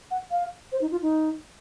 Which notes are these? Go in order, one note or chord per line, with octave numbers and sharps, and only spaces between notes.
F#5
F5
C5
D#4
F4
D#4